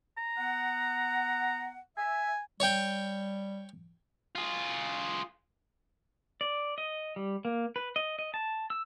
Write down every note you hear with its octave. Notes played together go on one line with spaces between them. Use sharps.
A#5
B3 F#5
E5 G#5
G3 C#5 G5
F4 G#4
D5
D#5
G3
A#3
B4
D#5
D#5
A5
E6